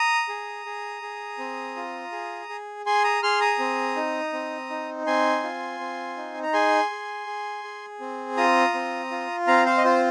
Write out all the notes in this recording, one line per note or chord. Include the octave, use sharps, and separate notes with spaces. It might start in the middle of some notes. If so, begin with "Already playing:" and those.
Already playing: A#5 D#6
G#4
G#4
G#4
C4
F4
G#4
G#4
G#4 G#5 C6
A#5 D#6
G#4 C6 F6
A#5 D#6
C4
D#4
C4
D#4
C4 G#5 C6
F4
C4
D#4
A#5
G#4 G#5 C6
G#4
G#4
G#4
C4
F4 A#5 D#6
C4
F4
C4 F5 A#5
C5 F5
D#5
F4 C5